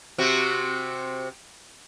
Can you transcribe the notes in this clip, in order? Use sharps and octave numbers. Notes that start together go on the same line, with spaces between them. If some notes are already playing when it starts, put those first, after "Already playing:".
C3 C4 F#4